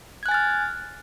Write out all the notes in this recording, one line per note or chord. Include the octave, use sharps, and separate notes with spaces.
G#5 F6 F#6 G#6 A6